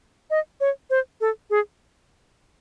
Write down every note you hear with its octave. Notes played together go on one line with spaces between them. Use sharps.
D#5
C#5
C5
A4
G#4